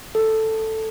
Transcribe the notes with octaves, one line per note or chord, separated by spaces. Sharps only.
A4